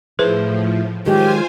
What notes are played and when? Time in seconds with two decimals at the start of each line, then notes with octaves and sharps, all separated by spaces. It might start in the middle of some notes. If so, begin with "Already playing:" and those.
0.19 A2 F3 E4 G#4 B4 C5
1.06 D#3 F#3 G#3 F4 G4 C5 G#5